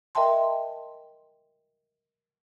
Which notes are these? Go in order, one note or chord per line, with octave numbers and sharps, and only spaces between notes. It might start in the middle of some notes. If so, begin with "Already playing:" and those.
A#4 D#5 E5 G5 A5 C6